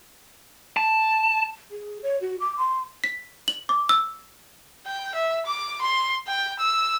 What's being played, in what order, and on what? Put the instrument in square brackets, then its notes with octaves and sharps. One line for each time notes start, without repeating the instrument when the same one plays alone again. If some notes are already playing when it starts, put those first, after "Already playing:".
[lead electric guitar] A5
[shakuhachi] G#4
C#5
F#4
D6
C6
[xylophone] B6
F#7
D6
E6
[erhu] G5
E5
D6
C6
G5
E6